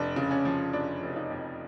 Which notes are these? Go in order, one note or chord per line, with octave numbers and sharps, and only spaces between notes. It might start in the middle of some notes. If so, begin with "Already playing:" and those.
Already playing: F1 D4
C#3
C#4
F3
F1 D4
F1
D#4
F2